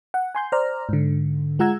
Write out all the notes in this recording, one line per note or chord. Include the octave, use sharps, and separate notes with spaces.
F#5
G#5 C6 G6
C5 D5 A#5 F6
G#2 D3
G#3 F4 F#5 A#5 E6 G#6